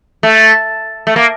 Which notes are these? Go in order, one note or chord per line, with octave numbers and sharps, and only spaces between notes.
A3
A3
A#3